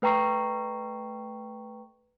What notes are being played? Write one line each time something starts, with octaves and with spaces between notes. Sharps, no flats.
A3 B4 G5 A#5 C#6 C7